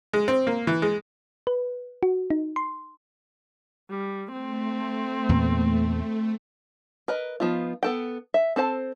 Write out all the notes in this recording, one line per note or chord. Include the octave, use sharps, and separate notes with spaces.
G#3
C4
A#3
E3
G#3
B4
F#4
D#4
C6
G3
A3 C4
E2 A#2 B3
A#4 B4 D#5
F3 B3 D#4 F4
B3 A4 G5
E5
C4 A4 C5 A5